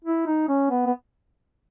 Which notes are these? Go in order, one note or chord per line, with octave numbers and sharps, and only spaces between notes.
E4
D#4
C#4
B3
B3